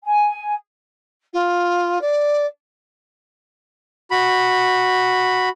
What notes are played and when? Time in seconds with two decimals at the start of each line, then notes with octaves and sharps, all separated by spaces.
0.05 G#5
1.33 F4
2.01 D5
4.11 F#4 B5